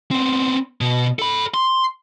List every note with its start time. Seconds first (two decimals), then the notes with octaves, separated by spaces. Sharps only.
0.11 B3 C4
0.81 B2
1.19 A4 B5
1.54 C6